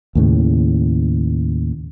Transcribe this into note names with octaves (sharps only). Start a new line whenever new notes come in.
D#2 A2 C#3